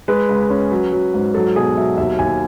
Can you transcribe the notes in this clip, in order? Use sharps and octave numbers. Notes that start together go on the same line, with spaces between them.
G#3 B4
C#2
C#4
F#3
F#3
G#2
F#3 A4
B2 G#4
F#3 E5
D#2 E5
D#2 G#5